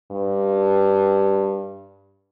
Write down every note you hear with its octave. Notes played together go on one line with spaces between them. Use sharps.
G2